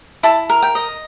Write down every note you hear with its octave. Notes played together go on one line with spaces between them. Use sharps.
E4 A5
A#4
G5
D#5